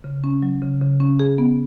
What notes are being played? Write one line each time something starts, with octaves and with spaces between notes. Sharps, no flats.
C#3
C#4
F#3
C#3
C#3
C#4
G#4
B3